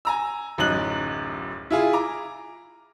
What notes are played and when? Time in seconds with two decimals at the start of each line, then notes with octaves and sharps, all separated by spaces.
0.05 G#5 A#5 E6
0.58 D1 A1 F#2 D#4 F#6 F#7
1.70 E4 F4 G#4
1.93 A#5 D6